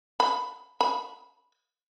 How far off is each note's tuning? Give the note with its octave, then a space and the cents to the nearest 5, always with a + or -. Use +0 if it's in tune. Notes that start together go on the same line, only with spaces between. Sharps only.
B5 +5
B5 +0